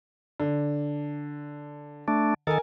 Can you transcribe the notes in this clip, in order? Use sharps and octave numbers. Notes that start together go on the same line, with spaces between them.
D3
A3 D4
D#3 A4 A#4 G#5